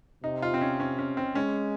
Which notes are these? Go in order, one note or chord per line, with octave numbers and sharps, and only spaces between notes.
C3 D#4
F4
C4
C#4
C#4
C#4
C4
G#3 C#4